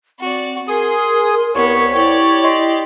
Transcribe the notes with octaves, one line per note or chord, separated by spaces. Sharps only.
C4 F#4 D5
G#4 A#4 C6 D#6
C2 B3 C#5
E4 G4 D5
D#5 C6